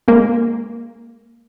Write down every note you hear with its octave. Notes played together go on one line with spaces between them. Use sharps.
G#3 A#3